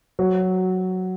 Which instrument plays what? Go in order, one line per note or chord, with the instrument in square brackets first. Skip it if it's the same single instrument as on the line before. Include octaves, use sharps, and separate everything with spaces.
[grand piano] F#3